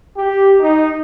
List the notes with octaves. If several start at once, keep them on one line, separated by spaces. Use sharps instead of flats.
G4
D#4